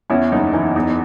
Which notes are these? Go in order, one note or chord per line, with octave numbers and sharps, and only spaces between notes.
E2 C#4 E4
F#1 D#4
E3 D#4
E2 D#4